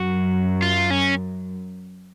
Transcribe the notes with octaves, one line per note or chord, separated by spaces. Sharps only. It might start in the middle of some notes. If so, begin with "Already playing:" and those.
Already playing: F#2 F#4
F4
C#4